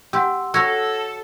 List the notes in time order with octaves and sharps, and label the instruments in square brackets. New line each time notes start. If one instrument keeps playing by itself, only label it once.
[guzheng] G4 [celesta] F#5 C6 E6
[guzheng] F#4 C#5 [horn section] A4 [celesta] E6 G#6 A#6